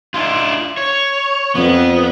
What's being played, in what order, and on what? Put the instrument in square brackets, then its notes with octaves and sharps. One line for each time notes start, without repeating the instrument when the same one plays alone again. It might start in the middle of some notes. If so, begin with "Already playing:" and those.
[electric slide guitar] D4 E4 F4
C#5
[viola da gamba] F2 [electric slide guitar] B3